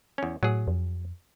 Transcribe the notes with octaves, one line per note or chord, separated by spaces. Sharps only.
E2 C#4
A2 F#3 G#4
F2